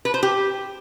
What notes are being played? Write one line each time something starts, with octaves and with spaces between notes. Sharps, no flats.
B4
C5
G4